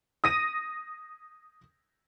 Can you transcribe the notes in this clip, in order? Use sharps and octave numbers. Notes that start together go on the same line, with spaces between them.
D#6 A#6 D#7